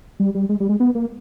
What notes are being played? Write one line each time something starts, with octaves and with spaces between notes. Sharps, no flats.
G3
G3
G#3
G3
G#3
B3
A#3